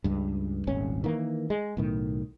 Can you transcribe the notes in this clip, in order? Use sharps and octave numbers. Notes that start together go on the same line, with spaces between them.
C#2 G2
D#1 G#1 C#4
D#3 E3 A#3
G#3
B1 A2 D#3